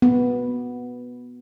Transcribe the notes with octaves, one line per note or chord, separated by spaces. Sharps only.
B3